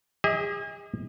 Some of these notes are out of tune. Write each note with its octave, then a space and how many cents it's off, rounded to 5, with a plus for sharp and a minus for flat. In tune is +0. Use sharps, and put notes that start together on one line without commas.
G#4 -40 D#5 +35